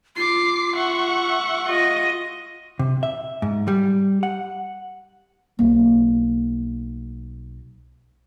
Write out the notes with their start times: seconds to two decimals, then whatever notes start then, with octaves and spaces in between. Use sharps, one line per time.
0.16 F4 D6 C7
0.76 E5 F#5 C#6
1.66 F4 D#5
2.79 C3
3.03 E5
3.42 G#2
3.68 G3
4.23 F#5
5.59 B1 A#3